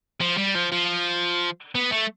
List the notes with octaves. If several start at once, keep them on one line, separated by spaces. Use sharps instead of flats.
F3
G3
F3
F3
B3
A3